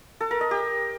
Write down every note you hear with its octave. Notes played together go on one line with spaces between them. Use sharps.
A4
A#4
D#5
G4